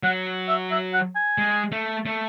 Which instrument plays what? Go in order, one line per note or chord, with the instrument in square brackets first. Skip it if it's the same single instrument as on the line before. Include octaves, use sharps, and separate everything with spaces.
[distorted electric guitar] F#3 [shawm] F#5
[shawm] E5
E5
F#5
G#5
[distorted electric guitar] G#3
A3
A3